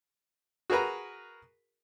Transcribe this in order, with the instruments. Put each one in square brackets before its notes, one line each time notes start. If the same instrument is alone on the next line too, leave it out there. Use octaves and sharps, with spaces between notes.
[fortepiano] F#4 G#4 A#4 B4 A#5